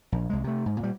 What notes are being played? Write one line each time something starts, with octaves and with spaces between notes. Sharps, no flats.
A#1
C2 G#3
C3 A3
G#2
A#2 G3